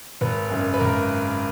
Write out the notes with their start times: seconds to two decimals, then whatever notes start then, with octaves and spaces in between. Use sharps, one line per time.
0.21 G#1 B4
0.50 F#2 C#3
0.74 B4
0.80 G#1 A#4